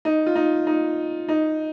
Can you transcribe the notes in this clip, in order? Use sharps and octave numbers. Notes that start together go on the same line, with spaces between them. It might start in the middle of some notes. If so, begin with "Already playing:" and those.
D#4
F4
D#4
D#4
D#4